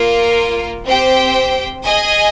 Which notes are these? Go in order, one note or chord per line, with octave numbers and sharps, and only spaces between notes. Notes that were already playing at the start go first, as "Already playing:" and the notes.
Already playing: A#3 F4 A#4 F5
C4 G4 C5 G5
G#4 D#5 G#5